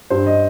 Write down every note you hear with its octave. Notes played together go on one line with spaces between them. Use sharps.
G2 C5
D#5